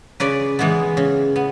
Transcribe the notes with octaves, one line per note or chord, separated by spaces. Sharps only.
C#3 B4 D5
E3 G#3 B3
C#3
B3